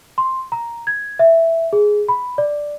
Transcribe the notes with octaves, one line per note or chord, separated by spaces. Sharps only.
C6
A#5
G#6
E5
G#4
B5
D5